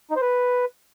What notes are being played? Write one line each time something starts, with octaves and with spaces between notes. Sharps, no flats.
D#4
C5
B4